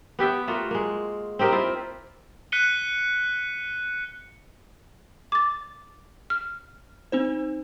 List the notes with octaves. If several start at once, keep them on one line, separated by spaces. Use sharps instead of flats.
B3 G4 E5 G5
A3 A#3 F4 F#4
G#3 A#3
C4 D#4 G4 A#4
E4 F4 C5
F#6 B6 C#7 D#7 G7
D6 A6
F6
C4 D#4 C5